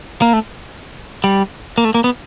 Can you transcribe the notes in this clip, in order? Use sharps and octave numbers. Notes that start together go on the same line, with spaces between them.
A#3
A3
G3
A#3
A3
A#3
B3